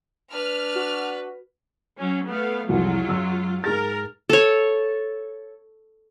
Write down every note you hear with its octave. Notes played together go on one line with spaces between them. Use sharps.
D4 B4 F6
F#4
F#3 C#4
A3 B3 F5
C2 F2 F#3 G#3 E4 F4
F#2 E6
G#2 G#4 A#4 A6
A4 C#5